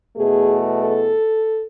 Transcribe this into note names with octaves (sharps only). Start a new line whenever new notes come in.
E2 B2 A3 G#4
A4